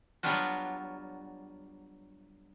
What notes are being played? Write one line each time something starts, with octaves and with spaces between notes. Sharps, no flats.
F#3 G3 B3 D4 F4 F#4